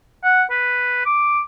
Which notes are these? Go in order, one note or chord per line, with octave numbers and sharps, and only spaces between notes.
F#5
B4
D6